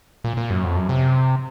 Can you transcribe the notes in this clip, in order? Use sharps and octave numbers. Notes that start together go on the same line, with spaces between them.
A#2
A#2
F#2
F2
F#2
C3